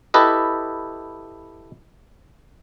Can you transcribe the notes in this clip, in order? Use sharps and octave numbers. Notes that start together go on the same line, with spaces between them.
E4 G4 A4 B4 D#5